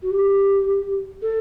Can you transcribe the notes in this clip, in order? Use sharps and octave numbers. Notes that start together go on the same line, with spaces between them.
F#4
G4
A4